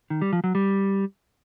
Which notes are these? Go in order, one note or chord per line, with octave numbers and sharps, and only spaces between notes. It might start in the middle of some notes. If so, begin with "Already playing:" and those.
D#3
G3
F3
F#3
G3